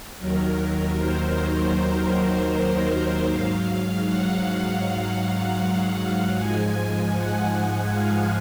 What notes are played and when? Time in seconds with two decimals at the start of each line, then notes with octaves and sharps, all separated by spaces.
0.18 D#2 D#3 F#3 A#4
0.96 C5
3.27 G#2 F#3 F5
4.04 F#5
4.81 F#5
6.35 G#2 F3 G#3 G#5
7.13 F#5
7.91 F5